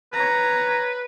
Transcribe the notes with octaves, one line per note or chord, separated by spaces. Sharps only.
B4 C#5 A#5